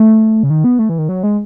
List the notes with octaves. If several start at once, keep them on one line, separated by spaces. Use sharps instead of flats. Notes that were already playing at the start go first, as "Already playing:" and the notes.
Already playing: A3
C#3
D#3
B3
A3
E3
D#3
F#3
G#3